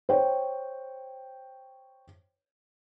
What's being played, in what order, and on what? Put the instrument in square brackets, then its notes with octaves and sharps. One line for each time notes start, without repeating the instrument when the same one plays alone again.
[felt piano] C5 C#5 G5